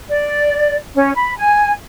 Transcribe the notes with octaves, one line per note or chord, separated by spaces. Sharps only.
D5
C#4
B5
G#5